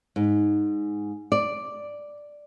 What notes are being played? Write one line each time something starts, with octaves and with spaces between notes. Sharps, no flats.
G#2
D5